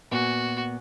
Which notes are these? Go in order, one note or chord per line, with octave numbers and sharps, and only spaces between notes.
A#2 B3 F#4 G#5